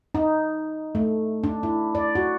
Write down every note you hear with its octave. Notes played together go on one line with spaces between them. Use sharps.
D#4
A3
D4
E4
D5
F#4